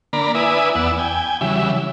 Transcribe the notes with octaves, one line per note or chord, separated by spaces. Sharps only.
D3 A#3 D5 A#5 B5
E4 B4 D5 E5 G#5 D#6
E2 B3 D5 F#5 E6
G5 G#5
C#3 E3 F#3 G3 E5